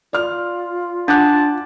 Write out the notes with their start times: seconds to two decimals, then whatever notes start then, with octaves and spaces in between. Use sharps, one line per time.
0.13 F4 D5 F6
1.08 D4 F#5 A5 D6 F#6